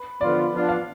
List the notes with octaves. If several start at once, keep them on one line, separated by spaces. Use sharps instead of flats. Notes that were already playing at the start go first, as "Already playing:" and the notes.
Already playing: B4
D3 F3 B3 F4 D5
F3 B3 D4 F4
F5